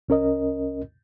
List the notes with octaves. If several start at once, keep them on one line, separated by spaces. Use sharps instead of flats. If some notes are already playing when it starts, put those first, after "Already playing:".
C2 C#4 A#4 D#5